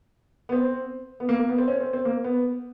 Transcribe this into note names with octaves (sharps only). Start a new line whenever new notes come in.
B3
C4
B3
A#3
A#3
B3
C4
C#4
C4
C4
A#3
B3